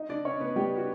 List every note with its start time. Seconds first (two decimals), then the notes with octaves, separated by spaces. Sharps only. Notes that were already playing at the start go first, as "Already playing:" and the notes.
Already playing: D#4 D#5
0.09 D4 D5
0.25 C#4 C#5
0.41 B3 B4
0.56 G3 G4
0.77 F#4